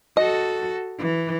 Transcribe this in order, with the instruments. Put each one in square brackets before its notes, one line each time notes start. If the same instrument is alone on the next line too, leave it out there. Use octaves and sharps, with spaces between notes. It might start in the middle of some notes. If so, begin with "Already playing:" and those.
[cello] F#4 A4 [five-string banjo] D#5
[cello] E3